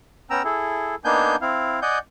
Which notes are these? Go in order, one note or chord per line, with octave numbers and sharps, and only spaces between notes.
B3 C#4 G5 A#5 E6
E4 G#4 A4
A#3 B3 D4 D#4 G#5 G6
C4 E4 F5
D5 D#5 F#5 G#5 G6